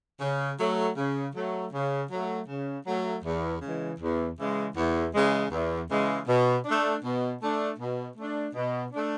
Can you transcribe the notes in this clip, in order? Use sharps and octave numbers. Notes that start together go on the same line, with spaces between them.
C#3
F#3 A3
C#3
F#3 A3
C#3
F#3 A3
C#3
F#3 A3
E2
C#3 E3 G#3
E2
C#3 E3 G#3
E2
C#3 E3 G#3
E2
C#3 E3 G#3
B2
D4
A3
B2
A3 D4
B2
A3 D4
B2
A3 D4